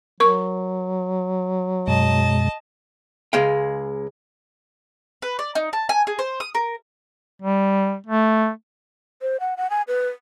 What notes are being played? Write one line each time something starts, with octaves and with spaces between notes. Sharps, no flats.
F#3 A#4 C#6
F#2 B2 G#3 D#5 A5
C#2 G#3 F5 G5
B4
D5
D#4
A5
G#5
G#4
C5
D#6
A#4
G3
A3
C5
F#5
F#5
G#5
B4